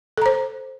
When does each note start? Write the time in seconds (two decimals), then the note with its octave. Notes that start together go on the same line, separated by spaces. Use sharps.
0.18 A4
0.22 A#5
0.26 C5